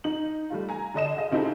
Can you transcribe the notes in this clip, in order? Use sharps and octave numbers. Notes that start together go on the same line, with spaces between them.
D#4 F#7
G3 A3 F4
G#5 A#5
D3 D4 D#5 E7
G#4 D#5 F5
C#3 C4 D#4 E4 G4 A4